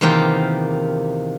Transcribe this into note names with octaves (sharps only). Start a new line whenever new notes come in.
E2 C3 D#3 A#3 F4 G4